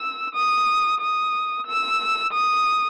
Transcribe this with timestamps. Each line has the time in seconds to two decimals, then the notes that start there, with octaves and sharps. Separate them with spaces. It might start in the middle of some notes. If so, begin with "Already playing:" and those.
Already playing: E6
0.34 D#6
1.00 D#6
1.66 E6
2.33 D#6